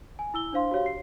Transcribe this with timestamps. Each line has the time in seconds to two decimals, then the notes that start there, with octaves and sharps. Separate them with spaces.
0.19 G#5
0.34 E4 E6 G7
0.53 D4 C5 F5 C6
0.71 F#4 G4 C#5 F5
0.86 C7